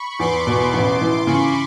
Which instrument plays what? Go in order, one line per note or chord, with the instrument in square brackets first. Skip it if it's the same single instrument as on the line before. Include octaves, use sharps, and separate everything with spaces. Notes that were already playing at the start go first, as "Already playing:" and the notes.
Already playing: [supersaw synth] B5 C#6
[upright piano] E2 [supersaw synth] C6 D6
[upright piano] B2
A1
E3
[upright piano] C#3 [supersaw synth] B5 C#6